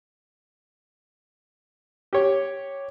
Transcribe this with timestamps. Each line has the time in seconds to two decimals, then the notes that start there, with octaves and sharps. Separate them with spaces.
2.13 G4 C#5